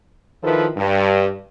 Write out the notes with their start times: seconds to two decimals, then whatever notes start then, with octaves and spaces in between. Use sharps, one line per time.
0.44 D#3 F3 E4 A4 B4
0.77 G2